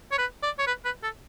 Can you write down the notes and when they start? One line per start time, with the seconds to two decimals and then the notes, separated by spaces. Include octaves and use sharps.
0.12 C#5
0.18 B4
0.43 D5
0.59 C#5
0.67 B4
0.85 B4
1.03 A4